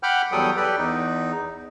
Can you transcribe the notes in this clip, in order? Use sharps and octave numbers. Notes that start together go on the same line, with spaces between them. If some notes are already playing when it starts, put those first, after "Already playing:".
F#5 G5 B5 D6 F6 G6
E2 F#3 G3 A4 G5 D#6
G4 A4 B4 D5 G5
E2 D#4